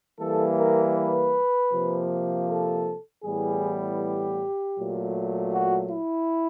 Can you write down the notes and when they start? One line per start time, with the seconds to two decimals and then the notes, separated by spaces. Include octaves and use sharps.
0.19 E3 G3 A#3 A4
0.58 A#4
0.96 B4
1.71 C3 F3 A#3
2.48 A4
3.24 A2 E3 G3 B3 G#4
4.00 G4
4.77 A#2 F#3 A3
5.53 F#4
5.91 E4